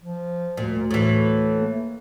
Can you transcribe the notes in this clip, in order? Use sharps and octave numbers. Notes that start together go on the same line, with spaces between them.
F3
D2 A#2
A2 E3
A#3